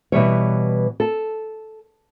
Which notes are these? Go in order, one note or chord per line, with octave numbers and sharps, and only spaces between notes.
B2 E3 G3 C#5
A4